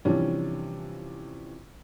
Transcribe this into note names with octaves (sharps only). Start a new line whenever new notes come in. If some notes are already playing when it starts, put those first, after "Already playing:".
C3 E3 F3 G3 C#4 D4